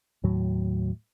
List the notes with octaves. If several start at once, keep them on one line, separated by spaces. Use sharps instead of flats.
D#2 A2 F#3